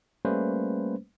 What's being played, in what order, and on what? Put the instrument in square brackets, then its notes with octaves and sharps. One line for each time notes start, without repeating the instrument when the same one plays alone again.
[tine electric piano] G3 A3 A#3 C#4 B4 C5